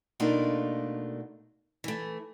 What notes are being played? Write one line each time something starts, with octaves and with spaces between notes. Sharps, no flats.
B2 A3 A#3 D4 D#4 F4
E3 A3